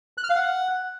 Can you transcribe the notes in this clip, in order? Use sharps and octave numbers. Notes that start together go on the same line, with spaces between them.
F#6
F6
F5
F#5